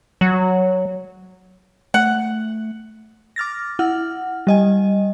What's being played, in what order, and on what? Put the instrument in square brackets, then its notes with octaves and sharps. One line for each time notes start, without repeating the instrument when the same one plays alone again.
[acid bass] F#3
[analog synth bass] A3 [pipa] F#5
[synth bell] D6 F6 A6 A#6
E4 F#5 F6
G3 D#5 G#5